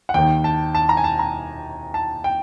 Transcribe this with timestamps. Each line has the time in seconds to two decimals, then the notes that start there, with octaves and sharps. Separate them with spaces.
0.09 F#5
0.14 D#2 D#3 G5
0.44 A5
0.75 A5
0.89 A#5
0.97 G#5
1.04 A5
1.19 A#5
1.94 A5
2.24 G5